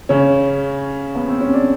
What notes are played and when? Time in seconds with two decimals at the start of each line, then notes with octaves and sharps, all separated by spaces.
0.09 C#3 C#4
1.15 B3
1.28 C4
1.41 C#4
1.54 D4